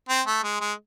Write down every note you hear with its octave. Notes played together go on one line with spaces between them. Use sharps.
C4
A3
G#3
G#3